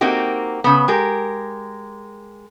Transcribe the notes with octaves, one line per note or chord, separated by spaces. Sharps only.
A#3 C4 D#4 F#4 G4
C#3 B3
G#3 G4 A#4